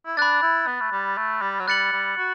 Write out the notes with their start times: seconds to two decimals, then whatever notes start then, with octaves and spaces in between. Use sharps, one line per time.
0.06 E4
0.17 D4 B5 F#6 A6
0.42 E4
0.67 B3
0.81 A3
0.92 G3
1.18 A3
1.42 G3
1.60 F#3
1.67 G3 F#6 A6 C#7 F#7
1.92 G3
2.18 F#4